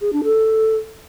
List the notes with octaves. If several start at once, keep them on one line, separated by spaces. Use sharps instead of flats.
G#4
D4
A4